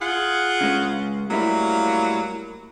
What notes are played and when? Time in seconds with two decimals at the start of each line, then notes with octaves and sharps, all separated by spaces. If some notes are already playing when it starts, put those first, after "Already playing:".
0.01 F4 G#4 F#5
0.61 C#3 G#3 C#4
1.31 A2 F#3 G3 A#3 E4